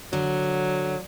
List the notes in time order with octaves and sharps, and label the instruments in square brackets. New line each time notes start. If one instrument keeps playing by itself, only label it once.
[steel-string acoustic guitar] D3 [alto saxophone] F#3